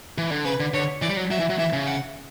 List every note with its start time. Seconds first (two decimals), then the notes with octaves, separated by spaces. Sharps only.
0.18 E3
0.31 D3
0.45 C#3 B4
0.60 D3
0.74 D3 C#5
1.02 E3 D5
1.10 G3
1.17 F#3
1.31 F#3 E5
1.40 E3
1.50 F#3
1.59 E3 E5
1.73 C#3
1.86 F#5